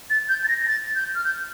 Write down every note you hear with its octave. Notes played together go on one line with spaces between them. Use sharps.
A6
G6
A6
A#6
A#6
A6
G6
F6
G6